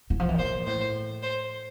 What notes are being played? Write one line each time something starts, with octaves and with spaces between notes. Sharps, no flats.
E3
F3
E3
A#2 C5
A2 C5
C5